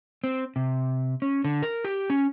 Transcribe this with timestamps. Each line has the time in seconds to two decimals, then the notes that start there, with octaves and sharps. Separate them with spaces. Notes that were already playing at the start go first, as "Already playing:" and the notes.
0.24 C4
0.56 C3
1.22 C#4
1.44 D3
1.63 A#4
1.84 G4
2.10 C#4